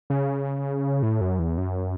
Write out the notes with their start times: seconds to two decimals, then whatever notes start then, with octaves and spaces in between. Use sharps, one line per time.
0.10 C#3
1.03 A2
1.21 F#2
1.39 E2
1.58 F#2